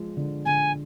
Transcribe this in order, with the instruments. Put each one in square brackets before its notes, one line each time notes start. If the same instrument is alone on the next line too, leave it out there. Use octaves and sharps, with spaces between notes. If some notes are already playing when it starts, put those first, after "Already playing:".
Already playing: [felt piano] F3 G#3
D3
[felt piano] D3 [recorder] G#5